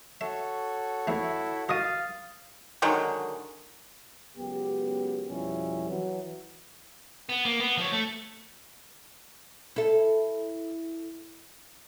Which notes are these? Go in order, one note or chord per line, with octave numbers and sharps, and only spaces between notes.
F#4 A4 C#5 E5
E2 A3 E4
F#4 D#5 F5 D#6 A6 D#7
D3 D#3 F#3 G#3
C#2 F#2 B3 G4
F2 B2 F3 G3 C#4 E4
E3 F#3
B3
A#3
B3
F3 C#5
A3
E4 A4